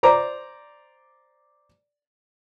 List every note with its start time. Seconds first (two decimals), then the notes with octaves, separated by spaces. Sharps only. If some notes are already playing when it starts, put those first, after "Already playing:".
0.03 C5 D5 A#5 D6